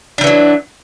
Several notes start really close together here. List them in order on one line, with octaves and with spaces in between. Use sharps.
D4 G3 E3 F#3